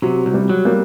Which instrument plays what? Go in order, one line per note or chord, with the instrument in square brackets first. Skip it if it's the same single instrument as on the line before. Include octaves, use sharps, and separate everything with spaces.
[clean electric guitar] C3 [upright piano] F#3
[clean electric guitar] C2
[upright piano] G3
[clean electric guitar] F#3
[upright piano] G3 A#3